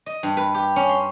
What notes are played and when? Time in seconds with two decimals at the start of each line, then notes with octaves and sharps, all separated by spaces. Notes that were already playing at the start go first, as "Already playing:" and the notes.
0.06 D#5
0.23 G2
0.37 B4
0.54 G4
0.76 C#4
0.89 C6